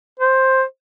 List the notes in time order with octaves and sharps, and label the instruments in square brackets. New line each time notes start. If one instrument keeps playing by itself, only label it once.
[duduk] C5